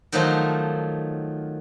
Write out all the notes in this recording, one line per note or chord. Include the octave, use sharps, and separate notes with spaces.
D#3 F3 F#3 A3 D#4 C5